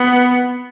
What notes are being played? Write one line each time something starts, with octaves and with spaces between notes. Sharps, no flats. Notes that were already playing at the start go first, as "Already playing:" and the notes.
Already playing: B3